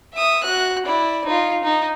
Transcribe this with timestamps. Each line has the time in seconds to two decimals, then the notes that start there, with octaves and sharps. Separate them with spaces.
0.14 E5 D#6
0.43 F#4 F#6
0.86 E4 D5
1.26 D#4 F4
1.63 D#4